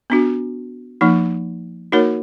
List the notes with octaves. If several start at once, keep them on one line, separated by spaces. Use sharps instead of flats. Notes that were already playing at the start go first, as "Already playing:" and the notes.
B3 D4 F#4
F3 A#3 D#4
A#3 D#4 F#4 A#4 C#5